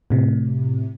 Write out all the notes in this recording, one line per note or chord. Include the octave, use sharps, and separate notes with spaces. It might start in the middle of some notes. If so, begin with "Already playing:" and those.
A2 C3